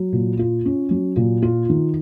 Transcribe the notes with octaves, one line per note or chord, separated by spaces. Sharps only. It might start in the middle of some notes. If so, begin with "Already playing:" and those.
Already playing: F#3
A#2
F4
C#4
F#3
A#2
F4
D#3